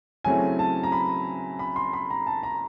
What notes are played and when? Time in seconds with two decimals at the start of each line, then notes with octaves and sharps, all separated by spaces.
0.25 C#3 F#3 A3 C4 E4 G#5
0.59 A5
0.83 A#5
0.92 B5
1.59 B5
1.76 C6
1.93 B5
2.11 A#5
2.27 A5
2.43 A#5